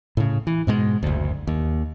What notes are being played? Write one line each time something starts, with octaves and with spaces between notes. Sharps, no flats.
A2 C#3
E3
G#2 B2 G#3
F#1 D2
D#2